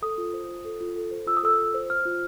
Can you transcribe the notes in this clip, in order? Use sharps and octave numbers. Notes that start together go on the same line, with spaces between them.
A4 D#6
F4
C5
F4
A4
F4
A4
C5
F4 E6
D#6
A4 E6
F4
C5
C5 F6
F4